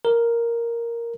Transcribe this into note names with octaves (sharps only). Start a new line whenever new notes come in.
A#4